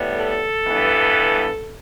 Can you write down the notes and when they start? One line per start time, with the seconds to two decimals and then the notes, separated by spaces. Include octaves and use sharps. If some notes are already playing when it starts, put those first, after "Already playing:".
Already playing: A2 G3 B3
0.15 A4
0.66 G2 E3 B3